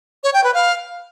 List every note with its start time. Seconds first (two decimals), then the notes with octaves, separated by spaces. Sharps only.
0.23 C#5
0.34 G5
0.44 B4
0.54 F5